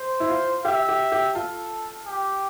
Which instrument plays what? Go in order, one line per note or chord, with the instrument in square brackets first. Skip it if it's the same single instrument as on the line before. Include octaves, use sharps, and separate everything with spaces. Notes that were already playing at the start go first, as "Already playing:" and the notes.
Already playing: [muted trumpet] C5
[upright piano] E4
F4
[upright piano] G4 [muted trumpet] E5
[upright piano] G4
G4
[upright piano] F4 [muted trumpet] A4
[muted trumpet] G4